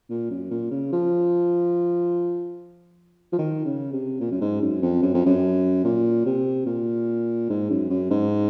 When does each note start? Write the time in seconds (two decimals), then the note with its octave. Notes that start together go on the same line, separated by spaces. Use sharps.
0.10 A#2
0.30 F#2
0.51 A#2
0.71 C#3
0.92 F3
3.33 F3
3.38 D#3
3.65 C#3
3.93 C3
4.20 A#2
4.31 F#2
4.41 G#2
4.61 F#2
4.82 F2
5.02 F#2
5.14 F2
5.26 F#2
5.84 A#2
6.26 C3
6.66 A#2
7.49 G#2
7.70 F#2
7.90 F#2
8.10 G#2